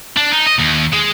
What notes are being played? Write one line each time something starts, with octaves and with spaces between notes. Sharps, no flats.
D4
D#4
D#5
D#2
G#3